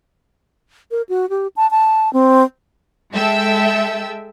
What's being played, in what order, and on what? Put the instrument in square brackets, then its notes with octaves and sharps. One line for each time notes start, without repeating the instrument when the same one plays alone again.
[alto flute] A#4
F#4
G4
A5
A5
C4
[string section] G#3 A4 E5 G5 E6